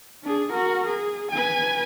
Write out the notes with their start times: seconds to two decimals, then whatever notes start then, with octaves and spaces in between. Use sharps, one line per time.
0.23 D4 G#4
0.53 F#4 A#4
0.87 G#4
1.32 B4 G#5